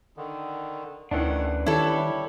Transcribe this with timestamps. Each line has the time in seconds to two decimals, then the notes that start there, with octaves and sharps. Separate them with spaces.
0.17 D3 D#3
1.11 D2 D#3 E3 A3 C#4 D4 F#5
1.66 D#3 G3 E4 G4 A4 C#5